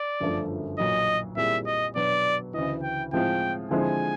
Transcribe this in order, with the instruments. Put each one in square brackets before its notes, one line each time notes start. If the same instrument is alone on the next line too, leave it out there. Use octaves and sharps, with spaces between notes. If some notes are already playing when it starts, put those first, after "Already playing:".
Already playing: [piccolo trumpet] D5
[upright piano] G1 F#2 D3 F3 A3
[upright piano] B1 A#2 F#3 [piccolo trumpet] D#5
[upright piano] A#2 G3 C4 E4 G#4 [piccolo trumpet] E5
[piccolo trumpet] D#5
[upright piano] B2 F#3 B3 D4 [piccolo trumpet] D5
[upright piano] D2 C#3 E3 [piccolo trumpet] D#5
[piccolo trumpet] G5
[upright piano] A2 F3 G#3 C4 F4 [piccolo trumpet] G5
[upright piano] D3 F3 G#3 C4 E4 [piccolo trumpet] G#5